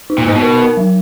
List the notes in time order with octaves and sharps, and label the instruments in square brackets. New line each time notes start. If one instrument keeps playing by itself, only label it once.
[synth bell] D#4
[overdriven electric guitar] A#2
[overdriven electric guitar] G#2 [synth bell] D#4
[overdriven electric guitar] B2
[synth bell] A#4
A#4
F#3